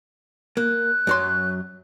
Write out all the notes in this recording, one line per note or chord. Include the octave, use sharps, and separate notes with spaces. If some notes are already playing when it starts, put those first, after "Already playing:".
A#3 F#6
F#2 F#3 C6